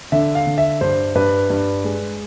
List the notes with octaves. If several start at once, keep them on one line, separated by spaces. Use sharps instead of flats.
D3 E5
F5
D3
E5
G2 C5
G2 B4
G2
G#3